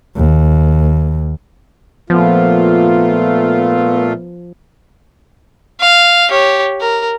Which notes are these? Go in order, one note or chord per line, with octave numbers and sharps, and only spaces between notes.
D#2
A#2 F3 A3 B3 F4
F5
G4 C#5
A#4